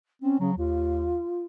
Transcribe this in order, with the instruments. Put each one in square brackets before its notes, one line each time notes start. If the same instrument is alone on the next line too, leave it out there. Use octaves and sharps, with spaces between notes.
[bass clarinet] C4 [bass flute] C#4
[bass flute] C#3 [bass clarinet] F#3
[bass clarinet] D#2 [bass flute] F4